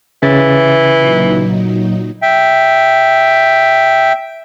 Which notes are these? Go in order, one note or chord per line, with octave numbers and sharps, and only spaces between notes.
C#3 E3 A6
A#2 F#3 D#4
E5 G5